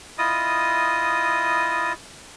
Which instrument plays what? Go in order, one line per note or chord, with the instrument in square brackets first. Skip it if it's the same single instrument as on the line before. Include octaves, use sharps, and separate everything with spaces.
[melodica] E4 F4 D#5 D#6